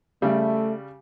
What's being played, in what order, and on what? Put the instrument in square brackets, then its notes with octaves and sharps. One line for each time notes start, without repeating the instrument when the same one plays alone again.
[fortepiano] C#3 G3 [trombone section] A3